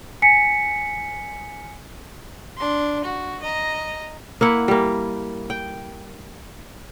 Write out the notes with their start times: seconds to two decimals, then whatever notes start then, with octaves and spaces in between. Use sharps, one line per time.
0.22 G#5 B6 C#7
2.57 D4 C6
3.05 F#4
3.42 D#5 A#5
4.41 A#3 E4 F#5
4.68 G3 A#3
5.50 G5